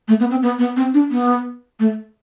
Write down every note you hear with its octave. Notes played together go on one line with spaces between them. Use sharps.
A3
B3
C4
B3
B3
C4
D4
B3
A3